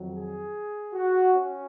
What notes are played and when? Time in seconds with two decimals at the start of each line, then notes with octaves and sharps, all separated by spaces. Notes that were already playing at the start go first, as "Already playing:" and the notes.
Already playing: F2 D#3 F#3
0.12 G#4
0.94 F#4
1.35 C#4